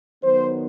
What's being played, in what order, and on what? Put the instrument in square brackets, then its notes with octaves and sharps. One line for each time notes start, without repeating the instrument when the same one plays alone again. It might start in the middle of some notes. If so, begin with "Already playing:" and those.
[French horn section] D#3 F#3 B3 C5